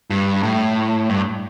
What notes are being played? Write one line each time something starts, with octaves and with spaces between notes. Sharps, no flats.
G2
A2
G2